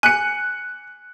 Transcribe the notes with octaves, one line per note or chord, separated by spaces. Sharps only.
G#5 F#6 C#7